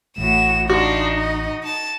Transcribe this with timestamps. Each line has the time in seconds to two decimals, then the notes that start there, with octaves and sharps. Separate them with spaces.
0.18 A1 A2 F#4 E7
0.70 D4 D#4 F4 F#4
1.15 D#5
1.64 A5 A6